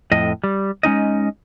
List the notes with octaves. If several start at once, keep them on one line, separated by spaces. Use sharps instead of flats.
F2 A2 D#5
G3
G#3 C#4 D#4 D#5